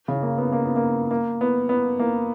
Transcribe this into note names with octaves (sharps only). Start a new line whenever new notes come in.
C#3
A#3
B3
A#3
B3
A#3
A#3
B3
B3
A#3